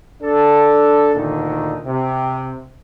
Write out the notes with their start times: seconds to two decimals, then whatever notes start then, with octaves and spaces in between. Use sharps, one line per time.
0.22 D4 A4
1.15 D2 A#2 D3 D#3 D#4
1.85 C3